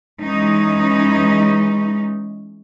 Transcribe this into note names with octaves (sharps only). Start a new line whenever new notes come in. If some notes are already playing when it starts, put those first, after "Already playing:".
E3 G#3 C#4 D#4